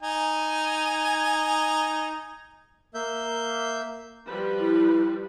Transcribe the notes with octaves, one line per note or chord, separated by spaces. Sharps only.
D#4 G#5
A#3 E5 G6
F3 G3 B4
E4